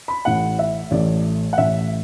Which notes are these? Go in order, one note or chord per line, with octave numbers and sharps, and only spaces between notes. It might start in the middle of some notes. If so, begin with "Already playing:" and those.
B5
A1 A2 A3 F#5
E5
A1 A2 A3 D5
F#5
A1 A2 A3 E5